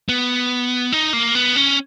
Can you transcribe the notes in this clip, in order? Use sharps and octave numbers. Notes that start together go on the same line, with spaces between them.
B3
D#4
A#3
B3
C#4